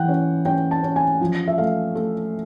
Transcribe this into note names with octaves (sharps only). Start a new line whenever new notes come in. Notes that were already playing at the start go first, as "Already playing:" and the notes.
Already playing: E3 F#5 G5
C#4
C#4 G5
A5
C#4
G#5
F3
E5
A3 F5
A3